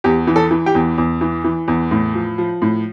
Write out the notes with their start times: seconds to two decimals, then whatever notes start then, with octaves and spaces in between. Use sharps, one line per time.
0.04 E2 G4
0.27 E3
0.36 A4
0.51 E3
0.66 G4 G5
0.75 E2
0.98 E2
1.21 E3
1.44 E3
1.68 E2
1.91 A2
2.15 F3
2.38 F3
2.62 A2